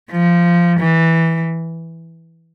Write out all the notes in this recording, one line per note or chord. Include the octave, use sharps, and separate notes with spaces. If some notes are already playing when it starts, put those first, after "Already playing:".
F3
E3